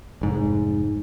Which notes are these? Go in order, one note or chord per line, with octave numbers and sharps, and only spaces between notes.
F1 G#2